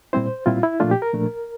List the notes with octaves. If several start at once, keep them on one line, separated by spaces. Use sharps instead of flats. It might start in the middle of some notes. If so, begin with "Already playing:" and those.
A#2 G3 C4 E4 C5
A#2 G3 C4 E4 F4
E4
A#2 F3 A3 D4 F4
G4
A#4
A#2 F3 A3 D4